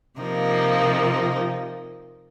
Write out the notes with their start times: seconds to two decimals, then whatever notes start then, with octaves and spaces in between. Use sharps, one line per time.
0.20 C3 F3 A#3 D#4